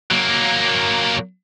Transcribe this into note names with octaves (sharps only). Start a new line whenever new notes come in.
F#3 A#3